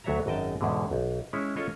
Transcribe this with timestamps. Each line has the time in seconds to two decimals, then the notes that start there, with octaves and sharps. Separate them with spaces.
0.04 D2 F#3 C#5 E5 A#5
0.26 G#1 F#2 D#5 G5 A5
0.61 E2 G#2 B2 D3
0.91 B1
1.33 G#3 C#4 E4 C#5
1.56 C#4 F4 A4 C#5 D#5